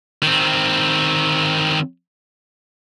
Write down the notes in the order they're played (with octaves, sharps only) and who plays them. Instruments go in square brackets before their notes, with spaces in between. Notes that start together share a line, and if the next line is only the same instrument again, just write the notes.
[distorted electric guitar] D#3 C4